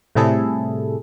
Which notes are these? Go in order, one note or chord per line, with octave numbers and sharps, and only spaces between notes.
A2 C3 G3 E4 G#4 A4